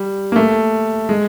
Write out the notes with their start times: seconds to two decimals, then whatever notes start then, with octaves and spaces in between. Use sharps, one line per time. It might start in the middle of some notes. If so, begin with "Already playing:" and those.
Already playing: G3
0.32 A#3
0.36 A3
1.09 G#3